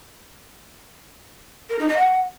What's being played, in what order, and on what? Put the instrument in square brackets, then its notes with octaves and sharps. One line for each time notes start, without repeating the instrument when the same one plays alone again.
[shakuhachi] A#4
D#4
D#5
F#5